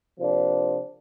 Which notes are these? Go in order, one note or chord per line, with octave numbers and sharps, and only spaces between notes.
C3 F3 A#3 D4